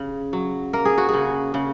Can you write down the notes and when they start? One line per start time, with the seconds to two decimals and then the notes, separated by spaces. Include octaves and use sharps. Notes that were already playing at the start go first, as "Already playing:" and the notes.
Already playing: C#3
0.33 F#3
0.73 A#3 A#4
0.85 G#4
0.98 F#4
1.09 C#3 G#4
1.54 C#3